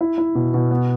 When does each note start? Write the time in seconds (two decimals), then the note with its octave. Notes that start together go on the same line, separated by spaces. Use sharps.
0.01 E4
0.18 E4
0.35 B2
0.54 B2
0.71 B3